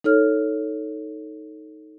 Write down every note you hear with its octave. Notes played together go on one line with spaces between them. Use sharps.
D#4 A4 C#5 F6